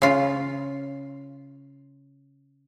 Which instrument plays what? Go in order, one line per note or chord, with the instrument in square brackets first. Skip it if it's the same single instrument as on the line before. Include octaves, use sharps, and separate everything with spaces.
[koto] C#3 F4